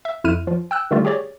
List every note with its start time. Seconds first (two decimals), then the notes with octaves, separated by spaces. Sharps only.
0.05 E5
0.24 F2 E4 F6 D#7
0.47 F3
0.71 G5 E6 F#6
0.91 D3 D#3 G3 A3 F4
1.05 G4 G#4 C#5 D5